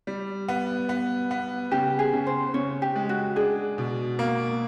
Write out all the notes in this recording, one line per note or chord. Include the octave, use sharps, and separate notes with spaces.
G3
B3
B3
B3
C#3 G4
G#4
C#3
C5
C#3 C#5
G4
G#3
F#4
D4 G#4
B2
A#3